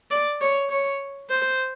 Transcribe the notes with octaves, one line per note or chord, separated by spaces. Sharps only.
D5
C#5
C#5
C5